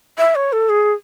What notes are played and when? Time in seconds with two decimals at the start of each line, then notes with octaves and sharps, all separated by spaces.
0.18 E5
0.35 C#5
0.52 A4
0.69 G#4